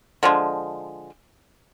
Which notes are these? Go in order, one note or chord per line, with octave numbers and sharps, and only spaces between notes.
D3 F3 G#3